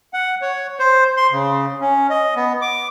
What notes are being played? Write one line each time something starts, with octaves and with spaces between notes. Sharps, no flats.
F#5
C#5
C5
C6
C#3
C#4
D#5
B3
D6